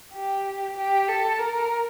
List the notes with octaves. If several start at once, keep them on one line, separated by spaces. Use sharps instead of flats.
G4
G4
A4
A#4